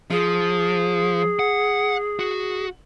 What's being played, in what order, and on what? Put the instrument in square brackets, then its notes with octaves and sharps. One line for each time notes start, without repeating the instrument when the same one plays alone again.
[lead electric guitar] F3 [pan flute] G#4
[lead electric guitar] F#5
F#4